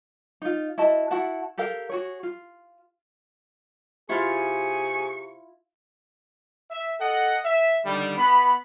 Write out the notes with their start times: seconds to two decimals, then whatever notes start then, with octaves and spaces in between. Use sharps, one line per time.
0.42 D#4 F4
0.78 E4 F#4 D#5 A5
1.11 E4 F#4 F#5 A5
1.58 G4 A4 A#4 F5
1.89 F#4 G#4 C#5
2.23 F4
4.09 C3 E4 F4 G#4 F5 C#6
6.71 E5
7.00 A4 D#5 F#5
7.45 E5
7.86 D3 D#3 G3
8.18 B3 B5